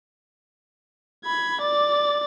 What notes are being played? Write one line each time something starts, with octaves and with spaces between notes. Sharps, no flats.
B5 G#6
D5 A6